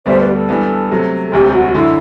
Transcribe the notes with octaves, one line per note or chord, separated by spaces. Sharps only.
D2 D3 G3 B3 D4 C5 E5
B4 D5
G4
A4
G2 E3 B3
C3 F#3 A3
A4
E1 D2 C3 G4
F#4
F#2 D3 E4